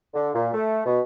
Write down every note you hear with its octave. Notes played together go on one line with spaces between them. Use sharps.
D3
A#2
A3
B2